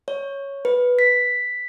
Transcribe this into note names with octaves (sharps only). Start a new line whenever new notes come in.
C#5
B4
B6